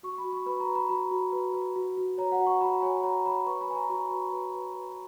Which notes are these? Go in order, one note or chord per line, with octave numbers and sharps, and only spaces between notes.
F#4 C#6
B5
F#4
C#6
B4 B5
A#5
B4
B5
F#4 B5
F#4
B4
B4
F#4
F#4
C#5 A#5
F#5
F#4
C#6
F#4 B5
C#5 G#5
C#5 A#5
C#5 B5
B4 C#6
B5
B4 G#5
A#5
F#4 C#6
B4 B5
B4
B4
B4